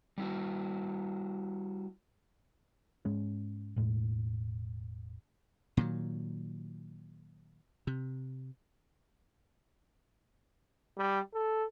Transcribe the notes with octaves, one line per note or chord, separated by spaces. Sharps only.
G3 E4 F#4
G#2 G#3 C#4
E1 A2 G#3
A#2 D#3 F#3
C3
G3
A4